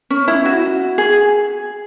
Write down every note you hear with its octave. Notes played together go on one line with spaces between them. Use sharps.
C#4
E4
F#4
G#4